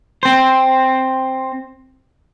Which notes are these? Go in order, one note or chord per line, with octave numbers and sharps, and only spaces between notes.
C4 C5